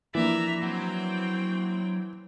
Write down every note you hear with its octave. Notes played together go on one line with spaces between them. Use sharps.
E3 F3 A#3 D4 D5 E5 A#5
F#3 C4 G5